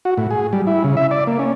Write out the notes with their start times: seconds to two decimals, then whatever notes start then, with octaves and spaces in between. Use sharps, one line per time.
0.05 F#4
0.17 A2
0.31 G#4
0.53 G3
0.67 E4
0.84 C#3
0.97 E5
1.11 D5
1.27 A#3
1.39 C#4